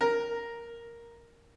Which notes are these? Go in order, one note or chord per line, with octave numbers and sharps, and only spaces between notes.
A#4